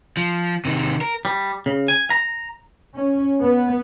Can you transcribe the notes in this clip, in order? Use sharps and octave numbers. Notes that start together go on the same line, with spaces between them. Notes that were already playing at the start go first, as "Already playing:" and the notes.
F3
C3 D#3
A#4
G3
C#3
G#5
A#5
C#4
B3